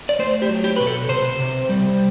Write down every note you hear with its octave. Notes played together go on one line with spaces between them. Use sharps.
D5
A3 C5
G4
F#3
G4
B2 B4
A4
C3 C5
C3
G3